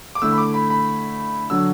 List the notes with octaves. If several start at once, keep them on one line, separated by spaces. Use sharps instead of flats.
D6
D3 A3 E4 E6
B5
D6
B5
B5
D3 F#3 D4 E6